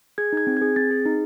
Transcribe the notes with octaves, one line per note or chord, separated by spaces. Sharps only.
G#4 G#6
D#4 G#6
C4
G#6
G#4
C4 A6
G#4
D#4